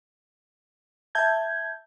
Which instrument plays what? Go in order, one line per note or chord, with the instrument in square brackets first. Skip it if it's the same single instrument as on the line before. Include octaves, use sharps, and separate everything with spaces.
[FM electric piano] E5 A5 G6 G#6